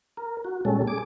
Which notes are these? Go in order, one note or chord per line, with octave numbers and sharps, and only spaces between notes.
A#4
F#4
A#2 G3 G#3 C#4 A4
G#4 D6